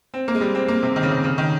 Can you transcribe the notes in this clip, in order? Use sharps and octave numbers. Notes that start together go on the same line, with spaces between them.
C4
A#3
G#3
G3
C4
A#3
C3
D#3
C#3
C3
C#3
D#3